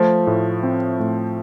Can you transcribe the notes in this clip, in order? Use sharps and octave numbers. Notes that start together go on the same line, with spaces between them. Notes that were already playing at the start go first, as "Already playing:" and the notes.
Already playing: F3 A3
A2
C4
A2